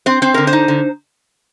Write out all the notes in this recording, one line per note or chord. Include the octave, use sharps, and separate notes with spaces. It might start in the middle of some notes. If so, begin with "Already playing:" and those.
C4 C5
C4 C5
D3 A#4
C5
D#4
D3